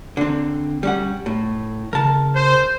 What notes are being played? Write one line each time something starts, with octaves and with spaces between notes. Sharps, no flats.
D3 C4
G3 C#4 F#5
A2
C#3 A#4 A5
C5